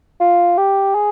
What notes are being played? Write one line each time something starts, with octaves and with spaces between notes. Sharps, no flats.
F4
G4
G#4